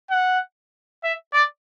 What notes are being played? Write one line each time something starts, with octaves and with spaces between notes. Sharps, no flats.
F#5
E5
D5